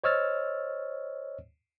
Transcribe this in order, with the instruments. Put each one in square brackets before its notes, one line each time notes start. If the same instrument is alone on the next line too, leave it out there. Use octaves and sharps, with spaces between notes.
[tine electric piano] C5 C#5 D#5 E6 F6 A6